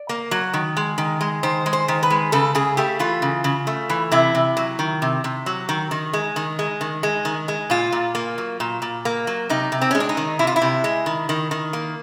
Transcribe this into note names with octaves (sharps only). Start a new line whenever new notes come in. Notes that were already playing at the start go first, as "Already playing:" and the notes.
Already playing: D5
A#3
F#3
D#3
G#3
D#3
G#3
D#3 C5
G#3
C5
D#3
B4
G#3
C#3 A4
C#3 G#4
A3 G4
E3 F4
C#3
C#3
A3
E3
C3 E4
C3
F#3
D#3
C3
C3
F#3
D#3
D#3
G#3
D#3
G#3
D#3
G#3
D#3
G#3
A#2 F4
A#2
A#3
F#3
A#2
A#2
A#3
F#3
C3 D#4
C3
C4
G#3 C#4
D4
D#4
D#3
C3 E4
F4
E4
C3
G#3
D#3
D#3
D#3
A#3